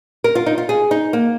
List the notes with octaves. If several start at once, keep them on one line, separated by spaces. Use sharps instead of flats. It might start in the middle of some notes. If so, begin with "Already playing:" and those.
A#4
F4
D#4
F4
G#4
D#4
A#3